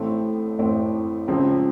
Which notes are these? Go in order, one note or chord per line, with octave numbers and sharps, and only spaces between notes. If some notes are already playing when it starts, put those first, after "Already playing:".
Already playing: A1 A2 A3 C4
A1 A2 A3 C4
C#2 C#3 F3 C4